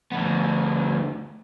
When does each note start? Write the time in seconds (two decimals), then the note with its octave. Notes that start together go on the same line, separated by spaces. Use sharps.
0.12 D2 B3